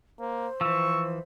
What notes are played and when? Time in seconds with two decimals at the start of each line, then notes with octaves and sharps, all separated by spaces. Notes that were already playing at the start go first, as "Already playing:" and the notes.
0.20 A#3 C5
0.61 E3 F3 C#6 E6